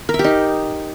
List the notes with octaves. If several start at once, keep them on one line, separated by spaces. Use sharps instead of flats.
A#4
E5
G4
D#4